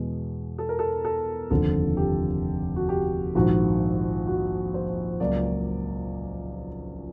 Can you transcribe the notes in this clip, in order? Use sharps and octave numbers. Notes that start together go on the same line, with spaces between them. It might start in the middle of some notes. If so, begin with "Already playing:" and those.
Already playing: E2 B2 G#3 G#4
A4
A#4
A4
A4
F1 D#2 D3 F3 A4
G4
F#4
G4
A#1 G#2 D#3 F#4
F#4
C5
C#2 C#3 F#3 A#3 D5